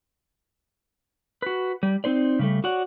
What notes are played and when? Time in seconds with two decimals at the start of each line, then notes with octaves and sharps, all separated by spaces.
1.42 F#4 B4
1.83 G3
2.04 C4 D#4 C5 D5
2.39 C#3 G3 A3
2.64 F#4 C#5 D5 F#5